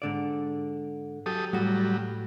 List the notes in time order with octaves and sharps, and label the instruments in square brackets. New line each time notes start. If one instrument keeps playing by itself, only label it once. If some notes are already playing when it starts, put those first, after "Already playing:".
[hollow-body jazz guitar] G#2 D3 D5
[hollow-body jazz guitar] F#3 [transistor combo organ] G4 A4 D#6
[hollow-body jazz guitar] A2 F#4 [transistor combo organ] F#3 G3